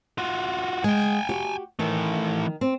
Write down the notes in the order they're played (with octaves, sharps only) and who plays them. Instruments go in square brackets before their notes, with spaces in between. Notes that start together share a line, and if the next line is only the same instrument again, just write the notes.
[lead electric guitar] F4 F#4
[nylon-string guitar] G#3 [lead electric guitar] G5 G#5
[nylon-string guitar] F#4 G4
[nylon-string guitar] D#3 [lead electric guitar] E3 A3
[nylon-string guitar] C4